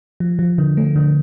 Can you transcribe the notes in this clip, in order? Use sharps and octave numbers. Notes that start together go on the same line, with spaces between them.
F3
F3
D3
A3
D3